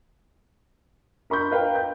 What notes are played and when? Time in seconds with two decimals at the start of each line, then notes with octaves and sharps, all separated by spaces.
1.30 A#4 B5 C#6 G6
1.51 A#4 B4 F5 G5
1.75 G6